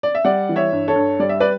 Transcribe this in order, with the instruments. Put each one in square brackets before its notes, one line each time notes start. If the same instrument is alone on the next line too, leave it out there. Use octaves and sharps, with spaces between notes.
[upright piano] D5
E5
G3 D5 F#5
E3
C#5 E5
G2
A4 C#5
G2
G3 D5
E5
B4 D5